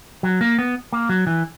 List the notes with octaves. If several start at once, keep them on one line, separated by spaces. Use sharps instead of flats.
F#3
A#3
B3
A#3
F#3
E3